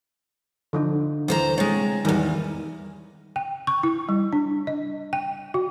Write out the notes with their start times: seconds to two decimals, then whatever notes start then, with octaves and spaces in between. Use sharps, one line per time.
0.73 D3 F3 D#4
1.28 D2 E3 C5 A#5
1.58 C3 G#3 C#5
2.05 E2 D#3 E3 G3 A#4
3.36 G5
3.67 C#6
3.83 E4
4.09 G3
4.33 D4
4.67 D#5
5.13 G5
5.54 F#4